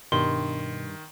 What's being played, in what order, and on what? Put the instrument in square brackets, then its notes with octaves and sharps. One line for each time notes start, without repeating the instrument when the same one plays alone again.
[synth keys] G2 [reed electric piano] B2 [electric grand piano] D#3 [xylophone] C6